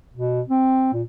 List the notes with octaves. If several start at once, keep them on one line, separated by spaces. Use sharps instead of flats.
B2
C4
A#2